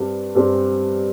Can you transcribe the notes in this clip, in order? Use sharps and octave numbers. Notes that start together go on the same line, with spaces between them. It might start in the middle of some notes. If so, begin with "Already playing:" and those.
Already playing: G2 G3 C4
G2 G3 C4